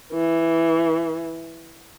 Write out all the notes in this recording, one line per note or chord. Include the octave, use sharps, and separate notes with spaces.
E3